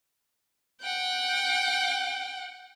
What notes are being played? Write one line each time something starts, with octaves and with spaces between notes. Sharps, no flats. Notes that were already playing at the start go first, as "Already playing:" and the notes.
F#5 G5